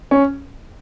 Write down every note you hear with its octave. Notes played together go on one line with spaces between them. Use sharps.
C#4